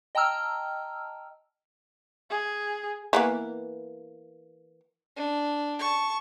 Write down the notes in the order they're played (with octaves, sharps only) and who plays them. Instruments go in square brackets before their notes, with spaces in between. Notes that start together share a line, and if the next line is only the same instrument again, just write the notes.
[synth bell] D#5 G5 A5 A#5 E6 F6
[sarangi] G#4
[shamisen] E3 A#3 B3
[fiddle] D4
A5 C#6